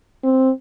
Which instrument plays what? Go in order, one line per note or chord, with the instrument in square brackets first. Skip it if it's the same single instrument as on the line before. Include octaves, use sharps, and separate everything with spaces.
[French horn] C4